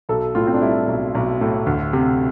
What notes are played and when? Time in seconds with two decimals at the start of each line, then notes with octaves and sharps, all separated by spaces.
0.09 B1 A4
0.35 A2 F4
0.47 C4
0.54 D4
0.62 G3 E4
0.88 B1
1.15 B1
1.41 A2
1.66 D2
1.93 C3